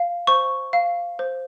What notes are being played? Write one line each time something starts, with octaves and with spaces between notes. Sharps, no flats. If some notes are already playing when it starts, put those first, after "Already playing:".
Already playing: F5
C5 C#6
F5
C5